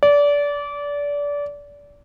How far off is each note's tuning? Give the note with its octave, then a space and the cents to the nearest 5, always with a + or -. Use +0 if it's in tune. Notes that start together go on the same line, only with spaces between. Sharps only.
D5 -25